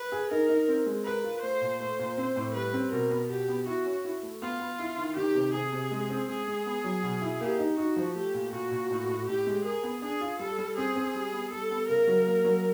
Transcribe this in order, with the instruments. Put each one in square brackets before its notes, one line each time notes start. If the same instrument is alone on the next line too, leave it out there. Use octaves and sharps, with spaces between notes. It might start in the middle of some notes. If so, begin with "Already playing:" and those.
Already playing: [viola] B4
[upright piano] G#4
[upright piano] D#4 [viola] A#4
[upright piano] D#4
C4
G#3
[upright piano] A#4 [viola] B4
[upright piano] F4
[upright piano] A3 [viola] C5
[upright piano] A#2
[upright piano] A3 [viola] C5
[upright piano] A#2
C4
A2
[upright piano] G3 [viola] B4
[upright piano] C4
[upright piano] B2 [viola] A#4
[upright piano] B3
[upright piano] B2 [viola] G4
[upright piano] B3
[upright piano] E4 [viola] F#4
[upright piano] C#4
E4
A3
[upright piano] B3 [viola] F4
[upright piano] B3
E4
D#3
[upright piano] D#3 [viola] G4
[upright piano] C3
[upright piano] C3 [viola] G#4
[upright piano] C3
G#3
C4
[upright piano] G#3 [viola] G#4
[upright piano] G#3
B3
F#3
B2
E4
[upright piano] A#3 [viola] G4
[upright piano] D#4
[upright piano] D#4 [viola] F#4
[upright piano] F3
[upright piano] A3 [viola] G4
[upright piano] A#2
[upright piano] A#2 [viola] F#4
[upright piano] A#2
A2
A2
[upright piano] A2 [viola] G4
[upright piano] G#3
[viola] G#4 [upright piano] A#4
[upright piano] B3
[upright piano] D4 [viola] G#4
[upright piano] F4
[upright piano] G3 [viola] A4
[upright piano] G3
[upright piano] C4 [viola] G#4
[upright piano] C4
G3
B3
[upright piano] G3 [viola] A4
[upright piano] B3
[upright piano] C#3 [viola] A#4
[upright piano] F#3
A#3
F#3